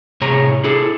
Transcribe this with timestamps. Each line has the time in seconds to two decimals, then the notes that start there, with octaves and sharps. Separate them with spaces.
0.21 A2 C3 G#4 C#5 A#5
0.64 E4 G#4 A4